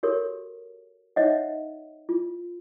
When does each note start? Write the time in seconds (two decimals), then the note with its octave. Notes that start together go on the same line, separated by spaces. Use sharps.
0.03 F#4 G4 A4 A#4 C#5
1.16 D#4 C5 C#5 D#5 E5 F#5
2.09 F4